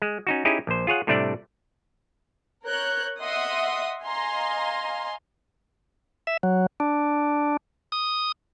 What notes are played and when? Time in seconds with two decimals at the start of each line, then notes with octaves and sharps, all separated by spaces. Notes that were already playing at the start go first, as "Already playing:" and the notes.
0.02 G#3
0.27 C#4 D#4 F#4
0.45 C#4 D#4 E4 G4 G#4
0.67 A#1 C5
0.87 F4 G#4 C#5 F#5
1.07 A2 C3 G3 A3 D4 D5
2.65 A#4 C#5 F#6 G6
3.22 D#5 E5 F#5 C6 D#6
4.05 D#5 F5 G#5 A#5 C6
6.27 E5
6.43 F#3
6.80 D4
7.92 D#6